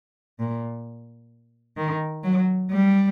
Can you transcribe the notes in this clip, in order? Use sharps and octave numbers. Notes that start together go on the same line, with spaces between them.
A#2
D#3
F#3
G3